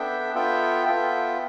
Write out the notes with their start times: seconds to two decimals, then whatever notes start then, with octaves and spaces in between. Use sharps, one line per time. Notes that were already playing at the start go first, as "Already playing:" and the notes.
Already playing: B3 D4 A4 E5 G5
0.34 B3 F4 A4 E5 G5
0.86 B3 F4 A4 E5 G5